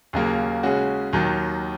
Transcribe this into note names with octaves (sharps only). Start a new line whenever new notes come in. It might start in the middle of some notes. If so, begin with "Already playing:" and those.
D#2 C#3 F#3 A#3
C#3 G#3 C#4 F#4
D#2 D#3 F#3